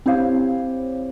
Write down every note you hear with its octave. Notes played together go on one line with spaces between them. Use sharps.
C4 E4 G4 C5 C#5 F5